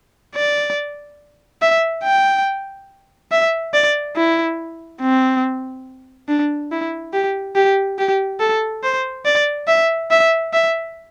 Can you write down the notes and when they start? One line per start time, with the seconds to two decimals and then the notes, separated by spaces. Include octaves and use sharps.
0.35 D5
1.62 E5
2.04 G5
3.32 E5
3.74 D5
4.16 E4
5.01 C4
6.28 D4
6.71 E4
7.13 G4
7.56 G4
7.98 G4
8.40 A4
8.84 C5
9.25 D5
9.68 E5
10.11 E5
10.53 E5